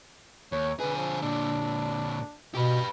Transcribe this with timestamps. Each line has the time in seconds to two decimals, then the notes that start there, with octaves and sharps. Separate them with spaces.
0.52 D#2 C#5
0.80 D3 G#4 B4
0.96 F3
1.22 A#2 D3 D4
2.55 B2 G4 B4